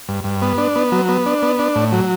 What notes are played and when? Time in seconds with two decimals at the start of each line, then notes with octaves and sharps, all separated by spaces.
0.08 G2
0.24 G2
0.42 B3
0.58 D4
0.76 B3
0.92 F#3
1.09 B3
1.26 D4
1.43 B3
1.59 D4
1.76 A2
1.92 F#3